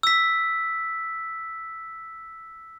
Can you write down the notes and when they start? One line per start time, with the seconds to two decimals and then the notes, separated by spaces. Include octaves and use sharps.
0.03 E6 B6